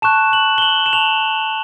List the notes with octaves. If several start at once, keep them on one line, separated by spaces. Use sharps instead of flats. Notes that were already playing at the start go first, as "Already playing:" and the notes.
A5 C#6 F#6 E7
F#7
G7
F#7
E7
A5 C#6 F#6 F7